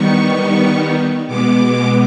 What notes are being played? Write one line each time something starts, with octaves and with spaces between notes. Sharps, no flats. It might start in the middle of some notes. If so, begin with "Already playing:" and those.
Already playing: D#3 G3 B3 D#4 C#6
B2 G#3 B3 D6